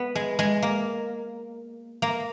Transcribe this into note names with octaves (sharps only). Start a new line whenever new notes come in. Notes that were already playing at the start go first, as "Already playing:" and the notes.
Already playing: B3
G#3
G#3
A#3
A#3